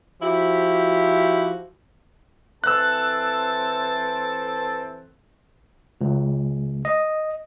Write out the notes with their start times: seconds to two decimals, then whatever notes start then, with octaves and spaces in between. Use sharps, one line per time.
0.21 F3 E4 F#4 G4
2.64 E3 C4 A4 A5 E6 F#6
6.01 C#2
6.85 D#5